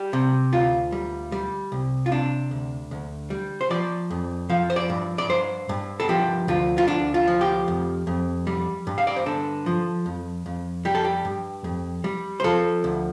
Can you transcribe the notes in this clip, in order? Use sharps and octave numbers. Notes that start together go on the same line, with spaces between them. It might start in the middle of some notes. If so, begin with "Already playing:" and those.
Already playing: G3 G4
C3
D2 F4
G3
G3
C2
F4
C3 D4
D2
D2
G3
C5
F3 D5
F2
F3 F5
C5
D5
G2
D5
G2 C5
G2
A4
F3 G4
D2 F4
F4
D2 D4
F4
F3
G4
F2
F2
G3
G2
F5
D5
C5
D3 A4
F3
F2
F2
G3 G4
A4
G4
G2
F2
G3
C5
F3 A4
D2